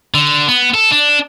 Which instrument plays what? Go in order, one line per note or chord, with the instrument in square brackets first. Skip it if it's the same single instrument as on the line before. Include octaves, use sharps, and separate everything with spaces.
[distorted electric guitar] D3
B3
A4
D4